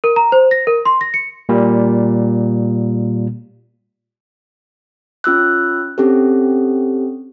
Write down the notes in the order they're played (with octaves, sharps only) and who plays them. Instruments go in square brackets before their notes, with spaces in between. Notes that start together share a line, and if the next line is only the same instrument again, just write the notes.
[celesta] A#4
A#5
C5
A#6
A#4
C6
A#6
C#7
[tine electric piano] A#2 G3
[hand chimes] C#4 F4 E6 F#6
C4 C#4 G4 A4